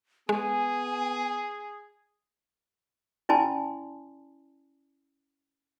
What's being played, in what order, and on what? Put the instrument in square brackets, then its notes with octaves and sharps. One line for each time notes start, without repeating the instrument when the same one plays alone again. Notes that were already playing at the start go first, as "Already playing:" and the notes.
[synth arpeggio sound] G#3 [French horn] B3 [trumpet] G#4 [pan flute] G#5
[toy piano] C#4 E4 D5 G#5 A5 C6